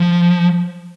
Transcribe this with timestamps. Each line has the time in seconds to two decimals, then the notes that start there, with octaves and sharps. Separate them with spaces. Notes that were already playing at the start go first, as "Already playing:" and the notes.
Already playing: F3